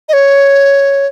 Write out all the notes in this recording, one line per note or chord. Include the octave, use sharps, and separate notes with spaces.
D#5
C#5